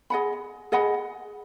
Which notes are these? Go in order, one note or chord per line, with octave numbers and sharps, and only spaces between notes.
G#4 D#5 F#5 B5
G#4 D#5 F#5 B5